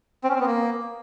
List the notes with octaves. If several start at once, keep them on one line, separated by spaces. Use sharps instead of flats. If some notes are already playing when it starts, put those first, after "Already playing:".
C4
C#4
C4
B3
A#3